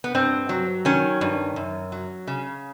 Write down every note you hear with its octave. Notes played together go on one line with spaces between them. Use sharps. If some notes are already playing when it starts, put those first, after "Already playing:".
B3
G2 C4
F#3
D#3 C#4
G2
F#2
F#3
C#3